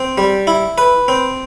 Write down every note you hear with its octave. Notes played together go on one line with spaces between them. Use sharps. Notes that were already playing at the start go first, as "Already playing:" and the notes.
Already playing: C4
G3
E4
B4
C4